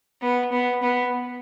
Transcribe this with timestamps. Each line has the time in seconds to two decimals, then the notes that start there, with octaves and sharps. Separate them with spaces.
0.22 B3
0.52 B3
0.82 B3